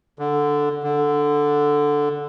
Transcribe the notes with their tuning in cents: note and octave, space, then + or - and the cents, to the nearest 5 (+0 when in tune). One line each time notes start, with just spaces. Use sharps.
D3 +0
D3 +0